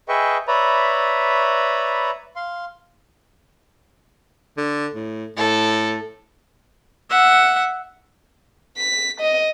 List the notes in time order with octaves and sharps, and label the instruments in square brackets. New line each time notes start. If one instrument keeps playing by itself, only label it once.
[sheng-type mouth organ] G#4 B4 D#5 E5 G5 C#6
B4 C#5 D5 E5 A#5 B5
F5 C6
[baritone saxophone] D3
A2
[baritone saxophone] A2 [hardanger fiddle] A4
[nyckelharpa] E5 F#5
[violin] B6
D#5